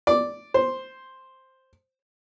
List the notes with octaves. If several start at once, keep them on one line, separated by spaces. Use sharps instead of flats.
D5
C5